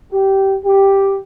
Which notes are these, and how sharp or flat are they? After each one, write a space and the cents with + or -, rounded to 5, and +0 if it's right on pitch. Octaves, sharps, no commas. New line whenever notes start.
G4 -15
G4 +0